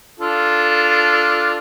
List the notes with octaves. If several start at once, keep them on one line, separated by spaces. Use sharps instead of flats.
D4 F4 A4